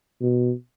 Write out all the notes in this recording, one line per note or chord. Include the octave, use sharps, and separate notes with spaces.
B2